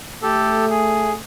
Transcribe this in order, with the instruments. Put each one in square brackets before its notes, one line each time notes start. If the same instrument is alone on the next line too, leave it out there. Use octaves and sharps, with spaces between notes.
[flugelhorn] A3 [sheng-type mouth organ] G4 A4
[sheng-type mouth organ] G#4